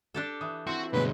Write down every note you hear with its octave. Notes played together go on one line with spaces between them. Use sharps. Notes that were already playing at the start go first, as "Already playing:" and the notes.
D4 G4 A4
E3 D#6
C4 E4 F#4 C6
D2 G2 B2 F#3 G#3 B4